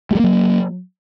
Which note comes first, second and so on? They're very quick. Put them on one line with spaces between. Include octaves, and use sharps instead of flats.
A3 G3 A#3 F#3